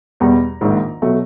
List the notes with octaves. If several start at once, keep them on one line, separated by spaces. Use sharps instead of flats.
E2 B2 G3 A#5
A#1 G#2 D#3
B2 F#3 A3